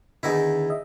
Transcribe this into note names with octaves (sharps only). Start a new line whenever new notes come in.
E2 D3 D#3 D#4 E4
D#5 E5